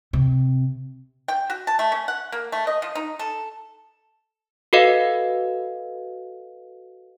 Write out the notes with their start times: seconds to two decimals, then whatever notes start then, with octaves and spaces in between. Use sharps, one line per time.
0.13 C3
1.28 G5
1.50 F#4
1.67 A5
1.79 A3
1.92 C#4
2.08 F#5
2.32 A#3
2.52 A3
2.67 D#5
2.82 F3
2.95 D#4
3.19 A4
4.73 F#4 A4 B4 D#5 F5